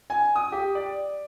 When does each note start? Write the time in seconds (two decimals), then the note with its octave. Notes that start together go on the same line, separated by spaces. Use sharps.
0.10 G#5
0.36 D#6
0.52 G4
0.75 D5